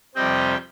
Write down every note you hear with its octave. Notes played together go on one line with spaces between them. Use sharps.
F2 C3 G3 C4 D#5 G5